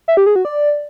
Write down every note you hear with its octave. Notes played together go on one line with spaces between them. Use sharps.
E5
G4
G#4
F#4
D5